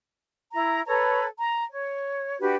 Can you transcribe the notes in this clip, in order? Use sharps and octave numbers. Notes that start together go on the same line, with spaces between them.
E4 A#5
A4 B4 C#5 A#5
A#5
C#5
D4 F#4 G4 B4